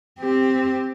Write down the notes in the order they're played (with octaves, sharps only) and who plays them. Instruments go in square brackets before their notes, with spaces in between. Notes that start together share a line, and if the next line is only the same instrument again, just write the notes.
[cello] C4 G4